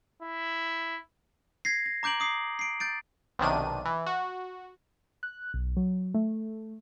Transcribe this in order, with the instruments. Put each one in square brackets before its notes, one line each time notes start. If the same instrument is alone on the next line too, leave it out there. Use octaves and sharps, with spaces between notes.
[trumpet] E4
[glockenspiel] G#6 A#6 C7
A#6
A#5 D6 G6 D7 F#7
D6 D#6 C7
C7 D7
G6 A6 D7
[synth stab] B1 C3 D#3 D4 D#7
E3
F#4
[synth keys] F#6
B1
F#3
A3